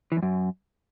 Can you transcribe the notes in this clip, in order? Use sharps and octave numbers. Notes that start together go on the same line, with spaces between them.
E3
E2
F#2